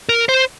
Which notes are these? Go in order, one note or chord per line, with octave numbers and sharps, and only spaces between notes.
A#4
C5